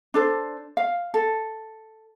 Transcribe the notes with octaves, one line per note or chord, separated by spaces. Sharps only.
D4 A4 C5
F5
A4